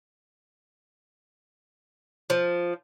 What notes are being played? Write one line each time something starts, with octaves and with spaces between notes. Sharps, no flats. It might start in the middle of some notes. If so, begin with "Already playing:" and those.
F3